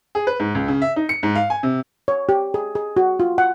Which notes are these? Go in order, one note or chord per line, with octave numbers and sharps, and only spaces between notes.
G#4
B4
G#2
C#2
C#3
E5
D#4
C#7
G#2
F5
G#5
C3
C#5
G4
G#4
G#4
F#4
F4
F#5